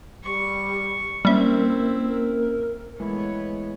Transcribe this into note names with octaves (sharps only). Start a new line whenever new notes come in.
G3 C#6
G3 A#3 C4 C#4 E4 A#4 E5
A#4
E3 G#3 A3 B3 E4 C#5